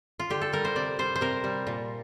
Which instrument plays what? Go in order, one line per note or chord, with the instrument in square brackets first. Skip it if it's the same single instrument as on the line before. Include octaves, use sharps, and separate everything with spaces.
[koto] F4
D3 G4
A4
G3 A#4
C5
C3 D5
G3 C5
C5
C3 A#4
G3
A#2